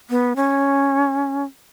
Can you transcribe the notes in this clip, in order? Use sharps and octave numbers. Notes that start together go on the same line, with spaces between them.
B3
C#4